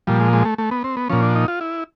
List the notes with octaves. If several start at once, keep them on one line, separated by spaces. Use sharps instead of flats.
A#2 F3 G3
G#3
G#3
A3
A3
B3
C4
B3
A#2 F3 C#4
D4
D#4
F4
E4